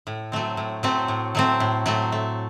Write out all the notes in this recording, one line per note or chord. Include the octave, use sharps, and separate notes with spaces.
A2
F#3 A3 C4
A2
F#3 A3 C4
A2
F#3 A3 C4
A2
F#3 A3 C4
A3